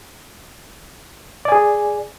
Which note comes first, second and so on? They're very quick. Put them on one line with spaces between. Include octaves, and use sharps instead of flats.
D5 G#5 G#4